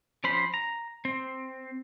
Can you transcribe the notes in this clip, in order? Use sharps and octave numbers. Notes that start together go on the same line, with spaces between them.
F3 C#4 C5 B5
A#5
C4